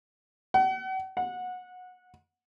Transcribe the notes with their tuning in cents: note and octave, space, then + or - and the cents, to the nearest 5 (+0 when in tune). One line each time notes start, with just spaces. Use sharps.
F#5 +40
F#5 -20